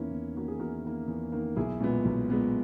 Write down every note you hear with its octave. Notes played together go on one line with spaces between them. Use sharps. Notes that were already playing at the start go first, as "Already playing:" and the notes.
Already playing: E2 D#3 A#3 C#4 E4
E2
D#3 A#3 F#4
G#4
E2 F#4 A#4
D#3 A#3
E2
D#3 A#3
B1 E4 G#4
A#2 G#3 B3
B1
A#2 G#3 B3